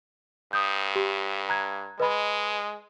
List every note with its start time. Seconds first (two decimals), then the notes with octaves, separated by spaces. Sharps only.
0.53 G2 D#6 G6
0.95 G4
1.49 A#5 F#6 G#6
2.00 G#3 B4 D#5 B5